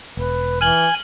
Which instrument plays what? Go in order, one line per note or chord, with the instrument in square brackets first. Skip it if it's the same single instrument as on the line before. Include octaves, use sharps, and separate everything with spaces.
[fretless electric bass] E1 [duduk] B4
[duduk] E3 [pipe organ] G#5 [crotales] F6 F#7 G7